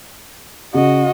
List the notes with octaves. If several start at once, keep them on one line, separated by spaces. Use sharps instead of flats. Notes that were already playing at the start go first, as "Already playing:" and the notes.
C#3 F#4 D#5